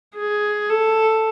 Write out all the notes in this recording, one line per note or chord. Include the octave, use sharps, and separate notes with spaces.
G#4
A4